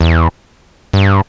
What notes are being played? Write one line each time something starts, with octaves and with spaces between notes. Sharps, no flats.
E2
G2